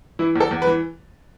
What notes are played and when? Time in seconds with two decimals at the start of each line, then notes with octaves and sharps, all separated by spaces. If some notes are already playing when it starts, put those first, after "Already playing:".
0.19 E3 E4
0.36 E2 A4
0.51 E2
0.62 B4
0.67 E3